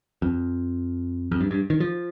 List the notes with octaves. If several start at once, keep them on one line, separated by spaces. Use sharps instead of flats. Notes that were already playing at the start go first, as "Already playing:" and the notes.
F2
F2
G2
G2
D#3
F3